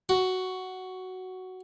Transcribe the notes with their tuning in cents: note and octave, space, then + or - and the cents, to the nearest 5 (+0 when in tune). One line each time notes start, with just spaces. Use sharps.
F#4 +5